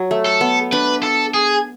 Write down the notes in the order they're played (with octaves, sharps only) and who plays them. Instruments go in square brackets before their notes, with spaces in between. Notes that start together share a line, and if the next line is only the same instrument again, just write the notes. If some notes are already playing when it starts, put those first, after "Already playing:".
Already playing: [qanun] F#3
A3
[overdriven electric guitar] A4
[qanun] B3
[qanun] D4 [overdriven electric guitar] B4
[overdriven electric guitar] A4
G#4